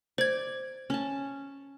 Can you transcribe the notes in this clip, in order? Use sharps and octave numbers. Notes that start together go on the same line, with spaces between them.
C5 D5 G#6
C#4 A5